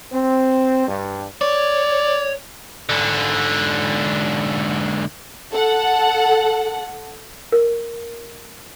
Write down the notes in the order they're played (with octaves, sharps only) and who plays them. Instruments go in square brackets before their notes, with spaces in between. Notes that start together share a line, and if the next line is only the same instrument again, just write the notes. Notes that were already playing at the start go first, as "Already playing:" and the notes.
[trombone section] C4
G2
[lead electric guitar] C#5 [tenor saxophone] D5
[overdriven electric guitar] G#2 D3
[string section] A4 F#5
[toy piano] A#4